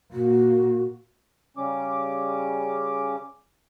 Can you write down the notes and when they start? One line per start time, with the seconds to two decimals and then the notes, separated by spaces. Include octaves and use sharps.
0.13 A#2 A#3 F#4
1.57 C#3 G3 C#4 D6